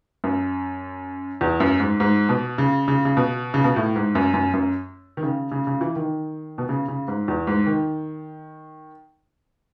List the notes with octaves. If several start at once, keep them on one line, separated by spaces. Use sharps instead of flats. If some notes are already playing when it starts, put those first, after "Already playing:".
F#2
E2
F#2
G#2
G#2
B2
C#3
C#3
C#3
B2
C#3
B2
A2
G#2
F#2
F#2
F#2
D#3
C#3
C#3
C#3
E3
D#3
B2
C#3
C#3
G#2
E2
G#2
D#3